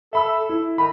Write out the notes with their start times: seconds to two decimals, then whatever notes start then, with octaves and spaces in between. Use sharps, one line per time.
0.13 A4 E5 B5 E6
0.38 A4
0.49 E4
0.78 D#3 B5